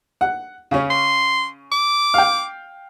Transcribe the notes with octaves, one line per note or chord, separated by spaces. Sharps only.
F#5
C#3 C#4
C6
D6
F5 G5